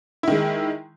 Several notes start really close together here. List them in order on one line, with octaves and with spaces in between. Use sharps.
E4 D#3 G#3